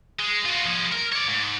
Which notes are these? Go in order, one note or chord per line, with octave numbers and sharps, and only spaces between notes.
G#3
F4 F#4
F3 G#4
A#4
C#5 D5
G#2